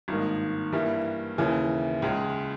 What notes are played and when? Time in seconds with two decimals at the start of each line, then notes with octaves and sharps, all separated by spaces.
0.08 G#1 G2 D#3 A#3 D#4
0.73 G2 E3 G3 A#3 E4
1.38 D#2 C#3 E3 A#3
2.02 C#2 C#3 G#3